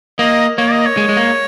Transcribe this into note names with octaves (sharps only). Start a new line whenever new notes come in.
A#3 D#5
A#3 C#5
D#5
C#5
G#3
G#3
A#3